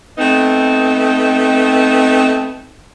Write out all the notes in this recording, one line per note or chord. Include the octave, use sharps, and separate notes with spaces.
A3 B3 C4 D#4